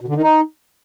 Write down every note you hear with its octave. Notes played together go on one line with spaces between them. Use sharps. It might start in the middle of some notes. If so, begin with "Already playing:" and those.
B2
D3
D#3
D#4